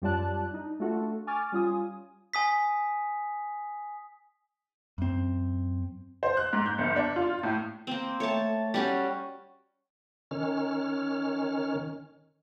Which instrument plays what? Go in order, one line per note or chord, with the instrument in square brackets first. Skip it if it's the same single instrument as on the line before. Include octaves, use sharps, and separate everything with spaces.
[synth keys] F#2 G3 F4 D5 A5 F#6
D4 D#4
A3 D4 F4 F#4 A4
G#5 C#6 D6 F6 A6
G3 C#4 F4 G#5 D#6
[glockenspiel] G#5 D#6 B6
[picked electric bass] F#2 C4
[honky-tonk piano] C5
F#6
G#2
G6
G1
D4
F4
A2
[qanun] A#3 C4
[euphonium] A3 [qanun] C#5 A5
[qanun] G3 C#4 F#4
[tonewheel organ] D#3 C#4 F6